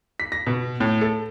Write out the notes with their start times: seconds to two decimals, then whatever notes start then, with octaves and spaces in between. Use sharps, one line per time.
0.20 B6
0.32 A#6
0.47 B2
0.80 A2
1.01 A4